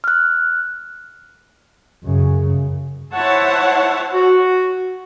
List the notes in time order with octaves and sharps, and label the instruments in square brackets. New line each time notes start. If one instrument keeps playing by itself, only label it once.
[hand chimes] F6 F#6
[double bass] F#2 C#3
[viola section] E4 C5 C#5 E5 F#5 A5
[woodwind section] F#4